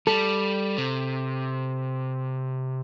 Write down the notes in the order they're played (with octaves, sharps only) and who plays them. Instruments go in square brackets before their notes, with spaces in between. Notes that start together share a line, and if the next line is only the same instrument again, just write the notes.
[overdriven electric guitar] G3 [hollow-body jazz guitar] A4
[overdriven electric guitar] C3